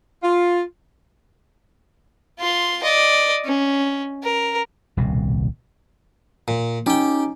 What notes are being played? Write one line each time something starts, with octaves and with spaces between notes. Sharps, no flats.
F4
F4 C6
D5 D#5
C#4
A#4
D#1 C2 B2
A#2
C#4 D#4 G4 G5 D6